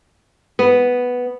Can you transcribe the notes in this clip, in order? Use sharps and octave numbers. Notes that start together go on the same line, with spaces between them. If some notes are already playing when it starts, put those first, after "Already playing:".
B3